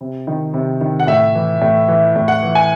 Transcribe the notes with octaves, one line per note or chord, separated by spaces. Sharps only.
C3
D#3
C3
D#3
F#5
A2 E5
E3
A2
E3
A2
F#5
E3
G#5